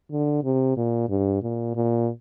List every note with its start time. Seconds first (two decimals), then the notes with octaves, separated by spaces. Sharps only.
0.11 D3
0.44 C3
0.77 A#2
1.09 G2
1.42 A#2
1.75 A#2